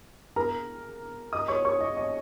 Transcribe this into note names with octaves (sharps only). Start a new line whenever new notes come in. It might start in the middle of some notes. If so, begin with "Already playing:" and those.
A#4 A#5
D#5 D#6
C#5 C#6
C#5 C#6
D#5
D#5